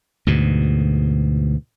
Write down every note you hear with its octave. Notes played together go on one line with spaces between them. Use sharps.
D2 G#2 B2